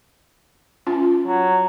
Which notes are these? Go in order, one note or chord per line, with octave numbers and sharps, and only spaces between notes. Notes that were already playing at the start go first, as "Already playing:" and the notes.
C#4 F4 A5
F#3